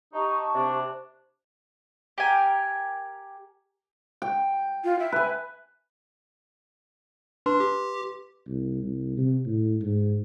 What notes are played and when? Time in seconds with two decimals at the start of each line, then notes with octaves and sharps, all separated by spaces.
0.13 D#4 G4 A5 C#6
0.55 C3 D4
2.18 G4 A#4 G#5
4.22 G5
4.84 F4
4.99 E5
5.12 B4 G#5
7.46 D4 B4 C6
7.60 G4
8.47 C2
8.83 C2
9.17 C3
9.46 A2
9.81 G#2